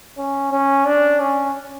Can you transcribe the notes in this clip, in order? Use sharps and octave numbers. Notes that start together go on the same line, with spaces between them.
C#4
C#4
D4
C#4